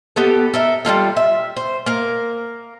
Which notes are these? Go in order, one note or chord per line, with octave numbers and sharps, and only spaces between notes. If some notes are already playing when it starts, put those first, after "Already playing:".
B3 G4 A4
A4 A#4 E5
G3 A#3 F4 A4
E5
C5
A#3 A#4